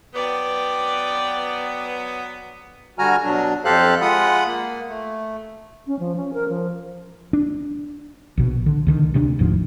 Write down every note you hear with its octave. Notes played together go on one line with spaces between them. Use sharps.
F#3 B3 D5 G5
D3 G3 F#4 G#5 A#5 F6
B2 F#3 D4
F2 G4 A4 C5 F5 F#6
G#3 F4 F#5 B5 D#6
A#3
A3
C#4
F3
C#4
A#4
F3
D4
A#1 B2
D3
C#2 D3 D#3
D2 C3 C#4 D4
E1 D2 G#2 F3